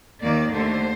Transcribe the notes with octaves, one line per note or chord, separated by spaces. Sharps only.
D#2 D#3 A#3 D5
D#2 D3 A3 C5